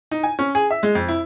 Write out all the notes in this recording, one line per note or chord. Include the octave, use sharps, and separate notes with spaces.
D#4
G#5
C#4
G#4
E5
G#3
F2
E4